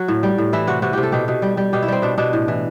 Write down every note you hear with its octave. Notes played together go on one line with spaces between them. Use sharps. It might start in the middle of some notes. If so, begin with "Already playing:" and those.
Already playing: F#3 F#4
A2
G3
A2
E3 E4
C3 F#4
C3 F#4
C3 G4
A4
B2 G4
B2
G3
G3
B2 G4
E4
G3 C4
B2 D4
B2 D4
A2
E3